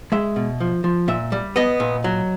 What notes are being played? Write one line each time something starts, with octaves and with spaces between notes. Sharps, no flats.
G#3 E5
B2
F3
F3
A#2 E5
G3
B3 D#5
A#2
F#3